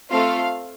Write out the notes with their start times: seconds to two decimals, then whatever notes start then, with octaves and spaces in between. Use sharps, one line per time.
0.12 A3 C4 F4 A4 F5